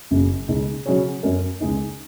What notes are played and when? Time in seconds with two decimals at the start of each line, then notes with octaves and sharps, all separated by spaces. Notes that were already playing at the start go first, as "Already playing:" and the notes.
0.11 F#1 F#2 C#3 A#3
0.48 C#2 C#3 G#3 D#4
0.86 C#3 F#3 C#4 G#4 C#5
1.23 F#2 F#3 C#4 A#4
1.60 C#2 C#3 G#3 D#4